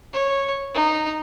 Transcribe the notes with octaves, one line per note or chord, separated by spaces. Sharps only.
C#5
D#4